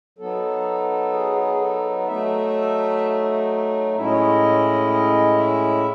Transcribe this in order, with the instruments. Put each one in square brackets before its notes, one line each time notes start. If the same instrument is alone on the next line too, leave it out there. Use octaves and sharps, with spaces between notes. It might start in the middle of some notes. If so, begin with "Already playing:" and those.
[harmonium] F#3 B3 D#4 A4
G#4
G#4
A4
F#3 A3 D#4 E5
A2 G#3 C#4 E4 E5
D#5
C#5
D#5
D#5
E5